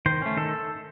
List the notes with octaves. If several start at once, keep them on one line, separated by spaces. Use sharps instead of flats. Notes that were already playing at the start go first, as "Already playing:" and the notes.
D#3 C5
A3 C#4
D#3 A4